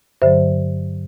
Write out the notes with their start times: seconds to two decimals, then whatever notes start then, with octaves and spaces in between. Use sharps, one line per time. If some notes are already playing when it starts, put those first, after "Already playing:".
0.22 G2 D3 F#3 C5 E5